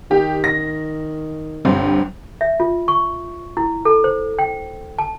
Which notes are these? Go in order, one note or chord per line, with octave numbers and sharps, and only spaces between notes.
D#3 G4
A#6
G1 G2 C4
E5
F4
C#6
E4
A4
C5
G5
A5